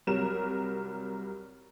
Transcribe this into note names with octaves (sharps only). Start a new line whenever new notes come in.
C2 F#3 G3 A#4 E7